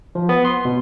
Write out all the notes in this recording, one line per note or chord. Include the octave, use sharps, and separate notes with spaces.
F3
B3
C6
B2